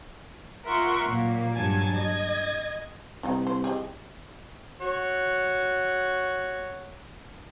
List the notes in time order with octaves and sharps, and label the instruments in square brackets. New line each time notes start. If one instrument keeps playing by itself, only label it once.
[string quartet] F4 A#4 E5 F#5 C6 C#6
A#2 F#3 A#3
G2 F#3 G#5 A5 G#6
D#5 G#6
[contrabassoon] C2 [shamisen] E3 C4 D#4
[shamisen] C5
G4 G#4 D#5
[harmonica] F#4 C#5